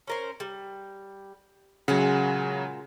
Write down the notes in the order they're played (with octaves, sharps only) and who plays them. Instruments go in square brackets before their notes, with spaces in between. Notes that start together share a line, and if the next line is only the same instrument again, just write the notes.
[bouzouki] C#4 A#4 C5
G3
[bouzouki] A#2 G#3 F#5 [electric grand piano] C#3 F#3